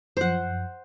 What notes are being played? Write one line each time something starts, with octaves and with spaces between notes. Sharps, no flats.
F#2 F3 C5 F#5